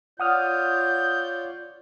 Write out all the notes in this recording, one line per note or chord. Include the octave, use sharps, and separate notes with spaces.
F4 C#5 D5 F#5 D#6 F6 G6